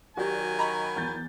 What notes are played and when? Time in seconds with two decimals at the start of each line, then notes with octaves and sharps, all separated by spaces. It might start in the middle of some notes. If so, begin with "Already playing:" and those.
0.17 D#3 F#3 F#4 G4 D5 G#5
0.59 D#5 A#5 B5 C#6
0.96 E2 G6 A6